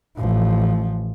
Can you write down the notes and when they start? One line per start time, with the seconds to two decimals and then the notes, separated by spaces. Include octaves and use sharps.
0.17 A1 F3